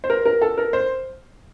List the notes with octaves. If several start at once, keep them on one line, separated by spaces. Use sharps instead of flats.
C5
A#4
A#4
A4
A#4
C5